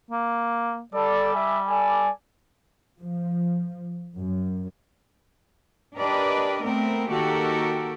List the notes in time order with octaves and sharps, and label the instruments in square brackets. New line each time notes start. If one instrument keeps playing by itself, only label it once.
[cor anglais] A#3
[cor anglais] G3 [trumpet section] A4 D5
[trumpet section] D5 E5 G#5
A4 D5 G#5
[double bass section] F3
F#2
[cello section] D4 G4 A#4 B4 D5 D#5
A3 B3 C4 A#4
D#3 A#3 F#4 G4 A4 A#4